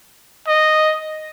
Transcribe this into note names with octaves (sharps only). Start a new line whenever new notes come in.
D#5